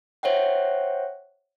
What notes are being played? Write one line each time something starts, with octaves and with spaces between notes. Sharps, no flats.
C5 C#5 E5 F#5 G5